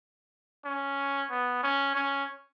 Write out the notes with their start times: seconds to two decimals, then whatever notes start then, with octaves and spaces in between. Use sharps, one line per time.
0.65 C#4
1.30 B3
1.64 C#4
1.96 C#4